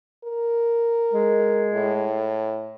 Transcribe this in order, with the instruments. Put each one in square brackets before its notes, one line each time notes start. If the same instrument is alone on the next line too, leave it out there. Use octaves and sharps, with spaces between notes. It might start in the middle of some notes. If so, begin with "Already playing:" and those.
[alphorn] A#4
[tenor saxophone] G#3
[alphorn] A2